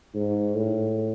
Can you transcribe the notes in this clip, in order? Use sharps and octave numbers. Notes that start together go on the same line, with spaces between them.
G#2
A2